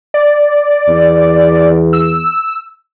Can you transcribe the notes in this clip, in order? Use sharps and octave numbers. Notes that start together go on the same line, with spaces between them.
D5
E2
E6